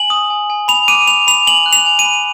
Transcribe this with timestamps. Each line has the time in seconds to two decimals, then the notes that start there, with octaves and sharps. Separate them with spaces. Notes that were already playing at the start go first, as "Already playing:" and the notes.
Already playing: G#5 F#7
0.10 D#6
0.30 G#5
0.50 G#5
0.68 B5 F7
0.88 D6 D#7
1.07 B5 F7
1.27 B5 F7
1.47 G#5 F#7
1.66 F#6
1.73 F7
1.86 G#5
1.99 D#7
2.05 B5